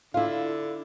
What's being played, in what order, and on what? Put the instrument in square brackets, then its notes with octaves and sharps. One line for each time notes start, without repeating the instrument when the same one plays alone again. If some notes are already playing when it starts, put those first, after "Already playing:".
[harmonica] D3 [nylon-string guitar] E4 F4 [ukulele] F5